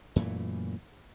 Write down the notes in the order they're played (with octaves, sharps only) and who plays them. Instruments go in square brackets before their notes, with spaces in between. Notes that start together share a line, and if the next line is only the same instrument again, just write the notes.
[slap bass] F#2 A#2 E3 A3